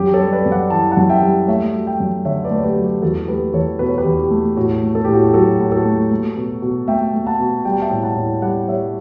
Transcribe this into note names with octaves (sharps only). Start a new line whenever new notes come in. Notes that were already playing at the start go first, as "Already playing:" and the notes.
Already playing: F#2 G4
A4 C#5
G3
B4 D5
F#2
D5 F#5
E3 A5
F#5 A5
F#2
E5 G5
G3
A3 C#5 E5
F#3
E5 G5
F#2
D3 C#5 E5
B4 D5
A3 C#5
G4 B4
F#3
G4
E2 F#4 A4
A3 G4 B4
E2 A4 C#5
B2 B4
C#5
G4 B4
E2
G4
A3
A2 F#4
A3
A4
A2 G4
F#4
G4
F#3 F#4 A4
A2
F#4 A4
A3
A3
B2
B2
A3 E5 G5
A3
F#5 A5
B2
G3 G5
A5
E5 G5
A2
F#5 A5
A2
G3 D5 F#5
G3 C#5 E5